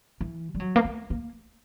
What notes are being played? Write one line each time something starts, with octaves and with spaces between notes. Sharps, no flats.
E3
G3
F#3
A#3
A3
A#3